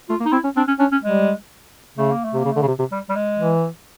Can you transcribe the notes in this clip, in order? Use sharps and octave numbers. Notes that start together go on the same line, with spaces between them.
A3 F4
A#3
D#4
C4 E4
C#4
C4 D4
C#4
C#4 D4
C#4
G3 G#3
C#3 A3
A#3
A3
C3 A#3
C#3
D3 A3
C#3
C3
C3
G3
G3
G#3
E3